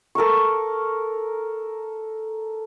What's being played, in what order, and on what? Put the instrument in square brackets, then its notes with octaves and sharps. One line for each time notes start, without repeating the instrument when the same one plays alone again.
[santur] A4 A#4 F5 C#6